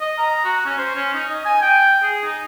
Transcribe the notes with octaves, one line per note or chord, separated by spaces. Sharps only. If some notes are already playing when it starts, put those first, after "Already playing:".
D#5
A#5
F#4
C#4
C5
C#4
D#4
D#5
G#5
G5
G#4
D#4